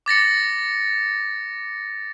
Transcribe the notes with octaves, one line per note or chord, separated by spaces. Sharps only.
D6 A6 A#6 C#7